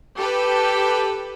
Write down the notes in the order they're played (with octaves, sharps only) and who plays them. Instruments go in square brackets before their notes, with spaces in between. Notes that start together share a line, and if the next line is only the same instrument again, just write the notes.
[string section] G4 A4 B4